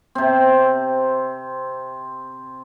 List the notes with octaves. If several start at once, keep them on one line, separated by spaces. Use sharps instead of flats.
C3 C4